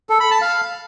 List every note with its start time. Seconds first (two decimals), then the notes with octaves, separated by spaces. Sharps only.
0.09 A4
0.20 B5
0.31 A5
0.42 F5